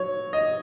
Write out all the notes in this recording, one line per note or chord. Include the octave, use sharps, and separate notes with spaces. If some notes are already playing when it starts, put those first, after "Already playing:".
Already playing: F#3 C#5
D#5